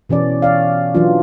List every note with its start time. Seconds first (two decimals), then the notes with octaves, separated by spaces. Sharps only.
0.09 B2 E3 C#4 D5
0.42 C#5 D5 F5
0.95 E3 F#3 D4 F4